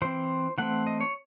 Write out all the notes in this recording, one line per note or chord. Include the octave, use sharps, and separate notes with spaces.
E3 C4 C5
E3 A3 C4 F#5
D#5
C#5